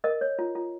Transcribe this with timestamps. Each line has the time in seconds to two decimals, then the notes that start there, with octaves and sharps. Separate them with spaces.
0.04 A#4 D#5
0.21 C#5
0.39 F4
0.55 F4